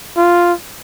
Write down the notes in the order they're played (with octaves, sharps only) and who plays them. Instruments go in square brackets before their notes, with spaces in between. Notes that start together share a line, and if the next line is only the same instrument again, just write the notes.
[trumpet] F4